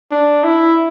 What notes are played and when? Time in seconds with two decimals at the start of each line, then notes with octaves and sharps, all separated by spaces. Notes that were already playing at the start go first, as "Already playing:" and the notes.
0.12 D4
0.44 E4